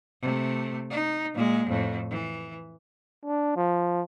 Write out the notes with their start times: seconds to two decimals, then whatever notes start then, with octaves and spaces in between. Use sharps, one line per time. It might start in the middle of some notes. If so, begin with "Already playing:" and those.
0.22 C3 A3
0.90 D#4
1.34 A#2 G#3
1.68 F2 A2
2.11 E3
3.25 D4
3.56 F3